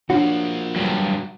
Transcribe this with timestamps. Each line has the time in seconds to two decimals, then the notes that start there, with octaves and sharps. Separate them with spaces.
0.10 F3 A#3 D4 F#4 C#5
0.76 G2 F#3